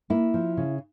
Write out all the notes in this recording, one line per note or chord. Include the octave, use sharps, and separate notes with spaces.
A#3 E4
F3
C#3